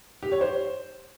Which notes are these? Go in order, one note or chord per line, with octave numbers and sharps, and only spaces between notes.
G4
C#5
C5